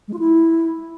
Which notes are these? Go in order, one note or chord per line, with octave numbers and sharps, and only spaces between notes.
G#3
F4
E4